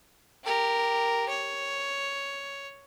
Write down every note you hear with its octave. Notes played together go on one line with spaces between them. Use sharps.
G4 A#4
C#5